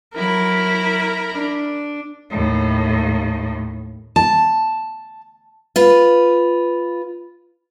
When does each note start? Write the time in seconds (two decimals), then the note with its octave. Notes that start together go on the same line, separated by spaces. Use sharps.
0.16 F#3 E4 A#4 B5
1.32 D4
2.31 D#2 A2
4.16 A5
5.76 F4 B4